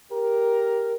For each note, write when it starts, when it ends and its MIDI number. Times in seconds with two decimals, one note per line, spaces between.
0.12 0.96 67
0.12 0.96 70